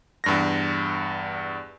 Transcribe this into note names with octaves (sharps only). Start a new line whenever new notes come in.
E2 G2 A#6